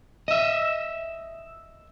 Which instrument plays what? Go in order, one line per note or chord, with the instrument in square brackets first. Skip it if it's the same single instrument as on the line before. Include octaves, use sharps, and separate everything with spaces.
[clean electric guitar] D#5 E5